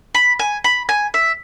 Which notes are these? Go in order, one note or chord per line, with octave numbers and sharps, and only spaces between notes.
B5
G#5
B5
G#5
E5